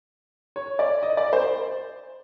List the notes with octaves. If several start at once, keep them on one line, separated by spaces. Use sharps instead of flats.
C#5
D5
D#5
D5
C5